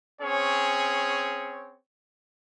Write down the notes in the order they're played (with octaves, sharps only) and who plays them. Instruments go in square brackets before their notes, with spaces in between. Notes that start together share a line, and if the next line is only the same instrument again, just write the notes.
[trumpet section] C4 C#4 G#4 C#5